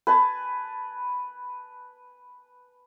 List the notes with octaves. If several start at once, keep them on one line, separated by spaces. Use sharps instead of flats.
B4 G#5 A5